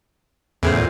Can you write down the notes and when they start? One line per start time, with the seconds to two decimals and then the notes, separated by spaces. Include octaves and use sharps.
0.63 E2 A2 C#3 C5
0.76 A#2